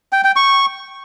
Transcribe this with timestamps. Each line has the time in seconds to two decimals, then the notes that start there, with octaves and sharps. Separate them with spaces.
0.13 G5
0.24 G5
0.36 C#6